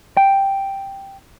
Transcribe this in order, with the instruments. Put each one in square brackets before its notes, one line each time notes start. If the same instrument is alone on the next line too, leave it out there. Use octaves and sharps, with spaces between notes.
[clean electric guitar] G5